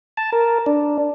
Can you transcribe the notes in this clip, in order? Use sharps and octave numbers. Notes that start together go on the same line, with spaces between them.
A5
A#4
D4